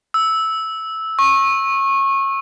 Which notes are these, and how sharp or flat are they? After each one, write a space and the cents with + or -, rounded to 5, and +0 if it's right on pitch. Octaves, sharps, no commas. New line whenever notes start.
E6 -10
C#6 -25